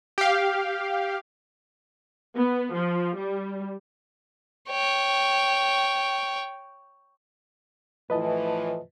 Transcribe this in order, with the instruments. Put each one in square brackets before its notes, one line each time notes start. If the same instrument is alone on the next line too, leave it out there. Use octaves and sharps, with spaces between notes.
[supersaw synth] G4 F5
[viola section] B3
F3
G3
[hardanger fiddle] C#5 G5
[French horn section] A2 E3 F3 [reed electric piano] B4 D#5 A5